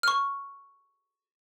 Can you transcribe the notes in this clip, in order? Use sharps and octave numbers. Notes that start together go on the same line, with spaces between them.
C#6 F6